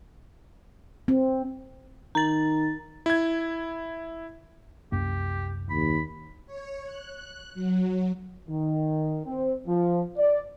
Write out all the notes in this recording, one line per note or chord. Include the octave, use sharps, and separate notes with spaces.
C4
D#3 A#5 A6
E4 G#6
C2 F#2 A#3 G4
D#2 B5
C#5
F#6
F#3
D#3
C4
F3
D5